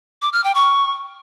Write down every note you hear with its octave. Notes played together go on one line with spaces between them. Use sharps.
D6
F6
G5
C#6